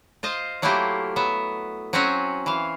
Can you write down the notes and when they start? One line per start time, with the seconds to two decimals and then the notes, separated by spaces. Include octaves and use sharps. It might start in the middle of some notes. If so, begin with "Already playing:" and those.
0.23 F4 C5 D#5 F5
0.62 F#3 A3 A#3 E4 F4 G4
1.16 F#3 B3 E5
1.93 F#3 C4 C#4 F#4 C#5 G#5
2.46 E3 F5